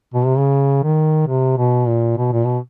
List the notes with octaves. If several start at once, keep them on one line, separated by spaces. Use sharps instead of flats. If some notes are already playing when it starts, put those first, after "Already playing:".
B2
C3
C#3
D#3
C3
B2
A#2
B2
A#2
B2